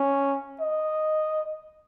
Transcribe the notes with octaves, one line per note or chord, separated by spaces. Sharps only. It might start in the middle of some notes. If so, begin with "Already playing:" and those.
Already playing: C#4
D#5